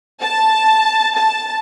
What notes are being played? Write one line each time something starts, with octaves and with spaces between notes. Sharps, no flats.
A5
A5